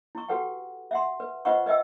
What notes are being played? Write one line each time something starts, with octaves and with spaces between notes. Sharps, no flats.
E4 C#6
F#4 G4 A4 B4 F#5 G5
E5 F#5 C6
B4
F4 B4 C5 D#5 F#5 C#6
B4 D#5 E5 G5 E6